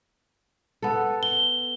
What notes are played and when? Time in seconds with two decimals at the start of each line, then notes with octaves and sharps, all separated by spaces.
0.82 B3 A4
1.23 G7